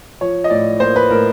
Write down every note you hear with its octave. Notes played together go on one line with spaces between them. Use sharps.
F3 C#5
D#5
A2 D5
A#3 C5
B4
A2 A#4